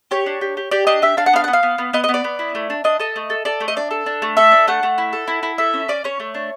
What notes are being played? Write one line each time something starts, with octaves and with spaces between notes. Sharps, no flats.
G4 C#5
D4
G4
G4
G4 D5
D4 D#5
G4 E5
D4 F5
F#5
B3 F5
B3 F#5
F5
B3
B3
B3 D#5
D#5
B3
D5
B3
E4
A3
D4
D4 D#5
A4 D#5
A3
A4
A4 D5
A3
D#5
D4 D5
A4
D4
A3
A4 E5
D4
A3 F#5
A3
E4
A4
E4
E4
A4 E5
C#4
C#4 D5
C#4 C#5
A3
D4